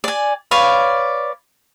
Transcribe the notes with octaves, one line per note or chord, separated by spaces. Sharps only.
D5 G#5
B4 C#5 D5 F5